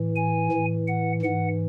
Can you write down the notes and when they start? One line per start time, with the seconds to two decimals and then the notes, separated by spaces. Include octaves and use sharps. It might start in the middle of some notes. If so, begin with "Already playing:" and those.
Already playing: A2 E3
0.16 G#5
0.52 A2 E3
0.87 F#5
1.22 G#2 E3 F#5